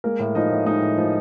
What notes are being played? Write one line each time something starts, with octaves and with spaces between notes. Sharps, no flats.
G#3 A#3 A#4
A2
F3 D#4 D#5
A2
G#3 D#4 D#5
A2
F3